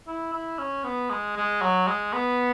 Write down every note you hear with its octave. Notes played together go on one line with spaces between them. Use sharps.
E4
E4
C#4
B3
G#3
G#3
F#3
G#3
B3